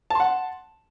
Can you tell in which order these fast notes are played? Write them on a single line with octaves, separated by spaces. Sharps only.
A5 C6 F#5